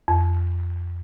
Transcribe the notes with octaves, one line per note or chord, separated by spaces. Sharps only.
F2